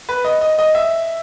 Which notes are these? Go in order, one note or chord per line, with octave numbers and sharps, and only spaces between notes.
B4
D#5
D#5
D#5
E5